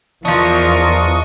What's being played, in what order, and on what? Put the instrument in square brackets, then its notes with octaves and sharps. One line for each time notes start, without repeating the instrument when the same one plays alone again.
[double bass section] E2 E3 [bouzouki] F3 D4 [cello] F4 A#4 [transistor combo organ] D#5 C#6